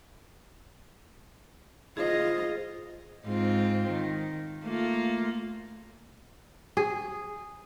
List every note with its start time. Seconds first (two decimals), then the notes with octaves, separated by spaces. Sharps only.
1.97 F4 G#4 C5 D#5
3.26 G#2 C4 F4
3.91 D#3
4.64 A3 A#3 F4
6.77 G#4